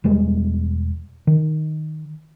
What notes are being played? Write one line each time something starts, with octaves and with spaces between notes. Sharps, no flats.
E1 G3 G#3
D#3